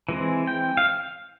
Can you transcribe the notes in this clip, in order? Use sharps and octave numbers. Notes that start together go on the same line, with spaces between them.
E3 G#3 C4
G5
F5